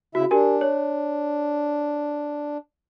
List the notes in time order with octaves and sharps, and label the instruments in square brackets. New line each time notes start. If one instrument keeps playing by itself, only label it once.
[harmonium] C#3 E4 E5 [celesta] F#4
[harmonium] D4 [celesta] G4 A#4 G#5
[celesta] C#5